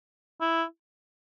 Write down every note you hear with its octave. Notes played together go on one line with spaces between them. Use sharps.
E4